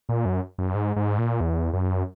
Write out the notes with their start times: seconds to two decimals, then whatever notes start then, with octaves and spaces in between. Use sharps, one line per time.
0.09 A#2
0.25 F#2
0.58 F#2
0.75 G#2
0.96 G#2
1.18 A#2
1.41 E2
1.73 F#2